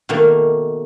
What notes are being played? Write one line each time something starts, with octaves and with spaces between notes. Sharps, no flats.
B2 D#3 A3 A#3